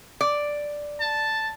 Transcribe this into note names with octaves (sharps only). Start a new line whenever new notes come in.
D5
A5